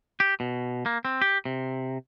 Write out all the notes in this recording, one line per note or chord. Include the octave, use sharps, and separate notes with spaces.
G4
B2
A#3
C4
G4
C3